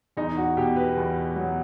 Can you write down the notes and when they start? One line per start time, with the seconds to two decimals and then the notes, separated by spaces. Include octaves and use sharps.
0.17 E2 D#4
0.37 F#4
0.57 B2 G4
0.76 B4
0.97 E2
1.36 F#3